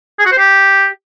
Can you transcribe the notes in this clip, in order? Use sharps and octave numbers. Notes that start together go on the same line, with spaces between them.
G#4
F#4
C5
G4